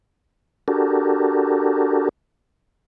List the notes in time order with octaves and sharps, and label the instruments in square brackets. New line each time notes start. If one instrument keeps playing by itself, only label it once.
[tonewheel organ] D4 F#4 G4 A4 A#4